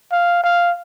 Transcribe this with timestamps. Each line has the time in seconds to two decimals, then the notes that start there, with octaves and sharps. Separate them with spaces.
0.12 F5
0.44 F5